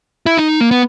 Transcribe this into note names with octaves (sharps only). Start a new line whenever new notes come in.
E4
D#4
A#3
B3